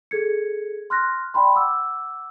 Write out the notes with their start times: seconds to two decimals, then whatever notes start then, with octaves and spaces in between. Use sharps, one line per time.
0.11 G#4 A4 G#6 C#7
0.90 C6 F6 F#6 A#6
1.34 D5 G5 B5 C6
1.55 F#5 D6 E6